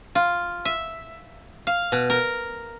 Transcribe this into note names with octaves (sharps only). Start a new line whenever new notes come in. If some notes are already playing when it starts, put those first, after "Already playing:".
F4
E5
F5
B2
A#4